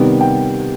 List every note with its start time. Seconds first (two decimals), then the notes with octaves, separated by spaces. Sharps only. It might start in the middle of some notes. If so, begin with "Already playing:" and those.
Already playing: C3 D#3 G3 B3
0.21 G5